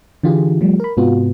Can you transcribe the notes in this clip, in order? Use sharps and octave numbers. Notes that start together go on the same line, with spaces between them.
D3 E3 F4 G4 G#4
F3 G3 A3
A#4 B5
G#2 C3 B3 F4 F#4